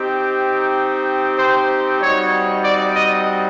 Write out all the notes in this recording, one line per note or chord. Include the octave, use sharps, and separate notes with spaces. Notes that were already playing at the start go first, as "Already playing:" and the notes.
Already playing: C4 D#4 G4
C5
G3 C4 D#4 F#4 C#5
D5
D#5